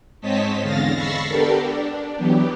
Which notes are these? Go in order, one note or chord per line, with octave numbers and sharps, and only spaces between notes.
G#2 C4 C#5 D#5 A5 B6
E2 D3 G#3 F5 A6 A#6
B5 C#6 E6 A6 A#6 C7
B3 D4 G4 A4 A#4
D4
E3 F#3 B3 G4